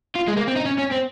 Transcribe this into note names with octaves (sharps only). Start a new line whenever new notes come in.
F4
G#3
A#3
C4
D#4
C#4
C#4
C4